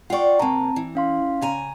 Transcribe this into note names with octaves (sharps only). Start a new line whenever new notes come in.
F4 D5 F#5 G5 C#6
C3 A#3 C4 A5 A#5
E3
C#4 F5 C6
C#3 G#5 A#5